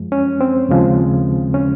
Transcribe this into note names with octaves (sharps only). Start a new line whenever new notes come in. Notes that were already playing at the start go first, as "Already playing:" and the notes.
Already playing: F#2 F3 G#3
C#4
C4
D#2 C#3 F3 G#3
C#4